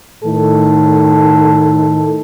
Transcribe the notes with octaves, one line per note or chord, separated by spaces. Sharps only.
A2 D#3 A4